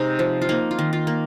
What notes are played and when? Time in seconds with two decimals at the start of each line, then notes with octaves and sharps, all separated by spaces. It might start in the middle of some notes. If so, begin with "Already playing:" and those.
Already playing: C3 G#3 C4 D#4
0.19 F3
0.42 F4
0.49 A#3 D#4
0.71 F4
0.79 D#3
0.93 F4
1.07 A#3